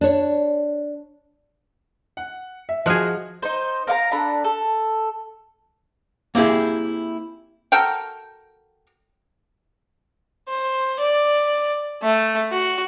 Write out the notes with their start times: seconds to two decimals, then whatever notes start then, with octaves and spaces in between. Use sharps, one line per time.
0.01 D4 C#5
2.17 F#5
2.69 E5
2.86 F3 F#4 G#4 D#5 F6
3.42 D#4 C5
3.87 A#4 F5 F#5 A#5
4.12 D4 A4 A#5 B5
4.44 A4
6.35 A#3 C4 E4 G4 G#4
7.72 F#4 A4 A#4 G5
10.48 C5
10.99 D5
12.02 A3
12.51 F#4